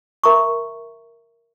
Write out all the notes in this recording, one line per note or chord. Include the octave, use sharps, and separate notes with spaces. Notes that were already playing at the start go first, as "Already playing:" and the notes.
A#4 E5 A#5 C#6